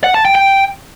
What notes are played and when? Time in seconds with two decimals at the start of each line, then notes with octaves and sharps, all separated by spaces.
0.04 F#5
0.14 A5
0.25 G5
0.35 G5